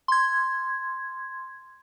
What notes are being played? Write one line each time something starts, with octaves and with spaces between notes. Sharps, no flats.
C6 G#6